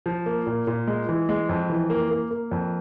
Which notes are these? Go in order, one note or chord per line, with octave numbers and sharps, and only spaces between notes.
F3
A#3
A#2
A#2
G#3
E3
G#3
F2
E3
A#3
A#3
A#3
F2